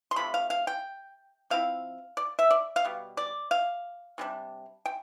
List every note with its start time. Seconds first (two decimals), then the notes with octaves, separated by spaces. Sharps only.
0.11 C6
0.16 C3 F3 A3 B5
0.34 F5
0.50 F5
0.67 G5
1.50 F3 C4 E4 F5
2.17 D5
2.39 E5
2.51 D5
2.76 F5
2.85 B2 G3
3.17 D5
3.51 F5
4.18 C3 E3 G3 D4
4.86 G5